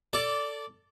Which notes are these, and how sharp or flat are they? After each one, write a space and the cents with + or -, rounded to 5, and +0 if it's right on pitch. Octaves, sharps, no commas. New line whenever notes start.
A4 +15 D5 -15